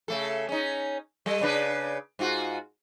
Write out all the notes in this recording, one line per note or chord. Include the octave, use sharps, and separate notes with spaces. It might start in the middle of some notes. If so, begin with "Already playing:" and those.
C#3 A3 A4
C#4 D#4
G3 A4 D#5
C#3 D4 B4
G#2 F4 F#4